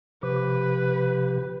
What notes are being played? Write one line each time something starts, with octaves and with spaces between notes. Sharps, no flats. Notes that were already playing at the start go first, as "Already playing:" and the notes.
C3 F3 G4 B4